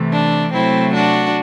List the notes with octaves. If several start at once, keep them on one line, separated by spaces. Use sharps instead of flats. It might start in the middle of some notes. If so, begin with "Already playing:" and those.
Already playing: C3 E3 A3
D4
C3 F#3 A3 C4 E4
D4 F#4